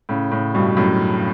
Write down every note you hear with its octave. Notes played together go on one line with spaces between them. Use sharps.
A2 C#3
A2 C#3
G2 B2
F#2 A2